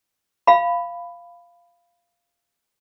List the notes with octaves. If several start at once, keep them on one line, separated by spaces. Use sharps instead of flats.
F5 B5